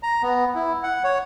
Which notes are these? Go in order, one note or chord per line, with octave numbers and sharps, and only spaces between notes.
A#5
B3
E4
F#5
C#5